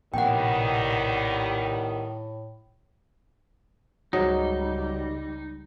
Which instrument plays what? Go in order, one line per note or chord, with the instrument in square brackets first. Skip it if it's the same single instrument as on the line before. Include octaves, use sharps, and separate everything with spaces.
[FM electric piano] A#1 C3 [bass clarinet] A2 [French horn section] D#3 G3 B3 [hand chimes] F#5 G5
[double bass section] C#2 G3 [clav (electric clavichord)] G#2 F#3 D#5 [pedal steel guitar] D#4